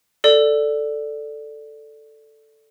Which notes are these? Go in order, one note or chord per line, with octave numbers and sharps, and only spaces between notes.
A4 D5